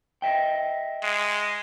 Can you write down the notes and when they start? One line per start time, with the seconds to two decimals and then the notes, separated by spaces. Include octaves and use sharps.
0.22 D#5 E5 G5
1.03 G#3